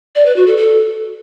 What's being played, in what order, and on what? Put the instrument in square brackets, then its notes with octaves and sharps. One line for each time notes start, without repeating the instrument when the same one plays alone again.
[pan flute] D5
B4
F#4
A4
A4